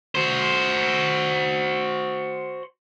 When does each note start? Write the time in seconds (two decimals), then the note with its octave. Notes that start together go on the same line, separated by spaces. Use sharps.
0.15 F#4 C5